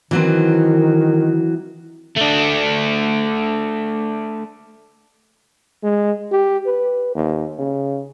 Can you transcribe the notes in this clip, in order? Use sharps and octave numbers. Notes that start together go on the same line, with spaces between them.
D#3 E3 F#3 C4
A3 D4
G#3
G4
B4
D#2
C#3